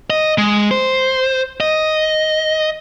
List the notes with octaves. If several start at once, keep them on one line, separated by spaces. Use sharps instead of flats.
D#5
G#3
C5
D#5